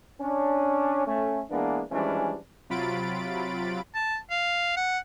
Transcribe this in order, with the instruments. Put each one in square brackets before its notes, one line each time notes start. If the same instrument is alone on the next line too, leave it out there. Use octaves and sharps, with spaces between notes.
[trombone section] C#4 D4
A3 C#4
E3 G#3 A#3 B3 D4
E3 F3 G3 G#3 C#4 D4
[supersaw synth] C3 F#3 F4 B5 A6 D7
[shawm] A5
F5
F#5